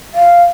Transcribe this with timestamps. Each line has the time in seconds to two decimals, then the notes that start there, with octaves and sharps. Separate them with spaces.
0.14 F5